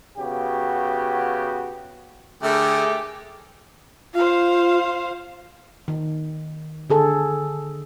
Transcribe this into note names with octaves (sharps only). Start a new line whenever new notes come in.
C#3 B3 F#4 G4
D3 A3 G4 G#4 A#4 G5
F4 C5 F5
D#3
D3 G#4 A4